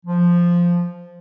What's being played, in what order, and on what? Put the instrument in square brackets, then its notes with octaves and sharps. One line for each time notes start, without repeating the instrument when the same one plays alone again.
[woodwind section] F3